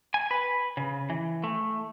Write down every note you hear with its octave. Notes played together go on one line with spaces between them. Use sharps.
G#5
B4
C#3
E3
A3